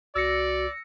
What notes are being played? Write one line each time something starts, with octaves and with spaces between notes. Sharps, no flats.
C2 F#4 D5 E6 A#6 C#7